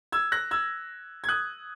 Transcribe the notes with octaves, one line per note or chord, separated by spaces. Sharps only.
E6 G#6
F#6 A#6
E6 G#6
G#6
D#6 F#6